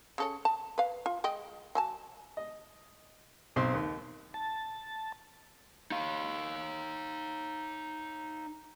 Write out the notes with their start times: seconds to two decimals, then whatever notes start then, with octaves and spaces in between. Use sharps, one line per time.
0.18 C#3 A4 C#5
0.45 A5
0.78 B4 F5
1.06 F4
1.24 G#3 D#5 G5
1.75 F#3 G#5 A5
2.37 D#5
3.56 B1 C4 C6
3.74 D#2
4.34 A5
5.91 D#4 F5